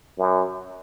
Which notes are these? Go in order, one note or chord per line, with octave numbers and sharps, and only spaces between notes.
F#2